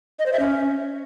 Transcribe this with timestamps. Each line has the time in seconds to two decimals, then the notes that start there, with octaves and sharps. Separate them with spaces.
0.19 D#5
0.26 C5
0.33 E5
0.39 C#4